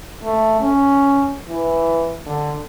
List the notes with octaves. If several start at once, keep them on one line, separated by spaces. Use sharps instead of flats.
A3
C#4
E3
D3